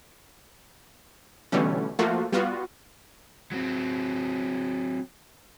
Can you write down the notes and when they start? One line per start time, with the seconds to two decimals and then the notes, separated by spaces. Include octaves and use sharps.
1.52 B2 D3 E3 G3 A3 C#4
1.99 F3 A3 A#3 F4 F#4
2.32 G3 B3 F4 F#4
3.51 F#3 C4